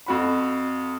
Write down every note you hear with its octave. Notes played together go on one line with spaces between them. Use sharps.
F2 F#4 B5